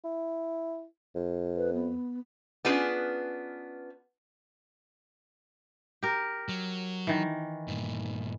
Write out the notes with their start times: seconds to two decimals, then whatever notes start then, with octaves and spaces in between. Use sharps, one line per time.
0.04 E4
1.15 F2
1.56 B4
1.73 B3
2.65 B3 C#4 D4 F4 G#4 B4
6.03 G4 A#4
6.49 F#3
7.07 D#3 E3
7.68 G2 A#2